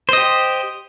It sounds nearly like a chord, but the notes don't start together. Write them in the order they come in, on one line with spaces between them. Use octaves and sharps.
C5 D#5 G4